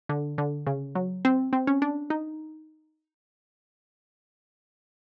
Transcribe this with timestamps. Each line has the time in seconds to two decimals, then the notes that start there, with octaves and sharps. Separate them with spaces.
0.09 D3
0.38 D3
0.67 C#3
0.95 F#3
1.25 C4
1.53 C4
1.67 C#4
1.82 D4
2.10 D#4